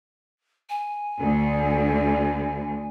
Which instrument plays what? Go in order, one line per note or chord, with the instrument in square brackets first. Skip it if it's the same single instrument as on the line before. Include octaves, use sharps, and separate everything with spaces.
[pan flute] G#5
[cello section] D2